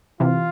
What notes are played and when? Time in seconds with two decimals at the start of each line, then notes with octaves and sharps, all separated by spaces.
0.20 C3 E3 F4